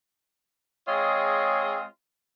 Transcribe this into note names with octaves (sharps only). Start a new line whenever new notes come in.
G#3 C4 F4 G#4 C#5 D#5